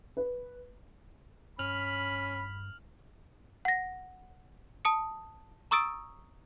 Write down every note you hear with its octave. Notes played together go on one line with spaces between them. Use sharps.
B4
G2 C#4 B5 F6 F7 F#7
F#5 A#6
A5 D#6 C#7
A#5 C#6 D#6 E6 A6 D7